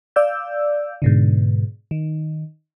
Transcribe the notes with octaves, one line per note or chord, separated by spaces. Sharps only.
D5 F5 E6 G6
G#2 B2 D3
D#3